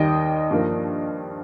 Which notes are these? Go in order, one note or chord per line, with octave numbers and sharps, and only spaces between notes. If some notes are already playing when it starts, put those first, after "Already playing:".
Already playing: D#2 D#3 G3 D#5 G5
G2 F3 A#3